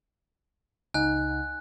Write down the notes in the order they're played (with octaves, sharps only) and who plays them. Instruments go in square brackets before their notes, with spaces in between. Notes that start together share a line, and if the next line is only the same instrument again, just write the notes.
[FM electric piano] C#2 D#4 F#5 [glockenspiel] G#5 F#6